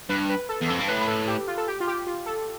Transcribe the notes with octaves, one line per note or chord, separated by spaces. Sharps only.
G2 B4
B4
A4
E2
F2 A4
G2
A2 B4
B4
A4
G4
F4
A4
G4
F4
G4
F4
A4